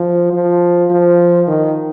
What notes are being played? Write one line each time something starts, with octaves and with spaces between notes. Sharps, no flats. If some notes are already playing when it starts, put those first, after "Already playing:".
Already playing: F3
F3
F3
D#3